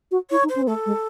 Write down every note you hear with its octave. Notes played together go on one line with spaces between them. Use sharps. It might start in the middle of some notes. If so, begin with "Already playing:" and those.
F#4
E4 C#5
D#4
C5
C#4
C4
A3 A4
G#3